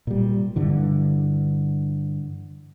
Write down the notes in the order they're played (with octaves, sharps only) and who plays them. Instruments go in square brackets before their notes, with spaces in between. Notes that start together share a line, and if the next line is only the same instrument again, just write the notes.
[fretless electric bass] A#2 G3
G2 D3 E3